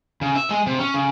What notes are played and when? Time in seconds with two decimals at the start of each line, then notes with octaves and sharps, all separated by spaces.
0.21 C#3
0.36 E5
0.50 G#3
0.66 C3
0.79 C#4
0.94 C#3